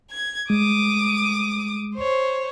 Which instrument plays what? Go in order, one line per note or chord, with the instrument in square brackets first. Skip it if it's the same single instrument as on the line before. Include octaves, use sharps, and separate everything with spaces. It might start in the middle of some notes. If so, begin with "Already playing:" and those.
[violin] G#6
[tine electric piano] G#3 [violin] D6 D#6
[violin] C5 C#5